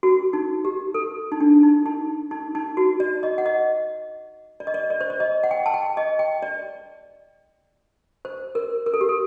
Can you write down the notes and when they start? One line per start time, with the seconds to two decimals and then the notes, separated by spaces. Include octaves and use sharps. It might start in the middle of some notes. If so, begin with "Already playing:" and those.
0.03 F#4
0.33 D#4
0.65 G4
0.94 A4
1.32 D#4
1.40 D4
1.63 D#4
1.86 D#4
2.31 D#4
2.55 D#4
2.77 F#4
3.00 D5
3.23 D#5
3.38 F#5
3.46 D#5
4.60 D5
4.67 D#5
4.74 D5
4.90 D5
5.01 C5
5.10 D5
5.20 D#5
5.44 F#5
5.51 G5
5.66 A5
5.74 G5
5.97 D#5
6.19 G5
6.42 D5
8.25 C5
8.55 A#4
8.86 A#4
8.94 A4
9.01 G4
9.09 A4